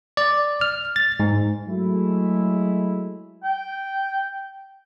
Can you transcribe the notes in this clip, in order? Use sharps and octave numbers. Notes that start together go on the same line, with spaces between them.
D5
F6
A6
G#2
F#3 G#3 A3 E4
G5